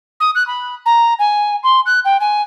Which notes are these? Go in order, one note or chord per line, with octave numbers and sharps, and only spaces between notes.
D#6
F#6
B5
A#5
G#5
C6
F#6
G5
G#5